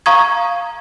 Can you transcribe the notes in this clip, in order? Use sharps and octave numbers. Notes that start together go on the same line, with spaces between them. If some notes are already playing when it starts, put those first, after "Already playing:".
F5 A#5 C#6 D#6 G#6